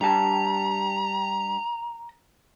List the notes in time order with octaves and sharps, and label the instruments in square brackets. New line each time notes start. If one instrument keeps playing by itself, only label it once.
[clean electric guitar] G2 G3 A5 [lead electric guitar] A#5